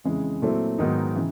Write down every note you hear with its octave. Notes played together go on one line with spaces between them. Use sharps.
F2 C#3 E3 G#3
A#2 F#3 A3 C4 E4
G#2 D#3 F#3 B3 D#4
C#3 E3